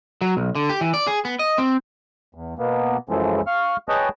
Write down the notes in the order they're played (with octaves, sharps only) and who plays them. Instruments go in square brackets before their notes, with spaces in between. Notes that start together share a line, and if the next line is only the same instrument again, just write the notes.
[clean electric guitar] F#3
B1
D3
G4
E3
D5
G#4
B3
D#5
C4
[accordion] E2
B2 A#3 B3
F#2 C#3 E3 F3 G#3 A3
F5 C#6 F6
G#4 B4 C#5 D#5 G5 A5